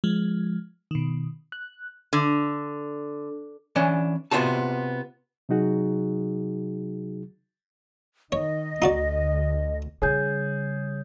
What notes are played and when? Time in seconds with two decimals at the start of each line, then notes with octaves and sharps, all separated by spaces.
0.04 F3 G#3
0.91 B2 D#3
1.52 F#6
2.13 D3
3.76 E3 C#4 D4
4.31 C3 B3 C4 F4 F#4 A5
5.49 C3 F#3 D#4 F#4 G#4
8.32 D#3 C#5 D#5
8.82 D2 D#4 F#4 D5
10.02 C#3 G3 G#4 C#5 G6